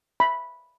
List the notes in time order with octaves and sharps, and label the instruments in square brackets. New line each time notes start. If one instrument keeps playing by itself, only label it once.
[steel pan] B5